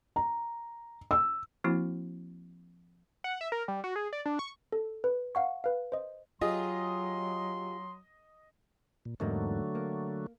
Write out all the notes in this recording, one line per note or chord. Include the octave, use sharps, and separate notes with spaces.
A#5
E6
F3 A#3 C4 E4 F#4
F#5
E5
A#4
G3
F#4
G#4
D5
D4
C#6
A4
B4
F5 F#5 C#6
B4 F5
C5 D#5
F#3 F4 G4 G#4 D#5 C6
A#2
E2 G#2 D3 F#3 A3 A#3
A#3